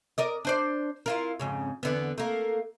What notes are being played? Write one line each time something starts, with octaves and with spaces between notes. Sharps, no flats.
A#4 D5 D#5
D4 C5 D5
E4 F4 A#4
F2 G#2 C#3
E2 D3 B3
A3 A#3